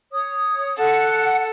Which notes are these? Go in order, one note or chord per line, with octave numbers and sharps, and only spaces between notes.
C#5 D#6
A4 F#5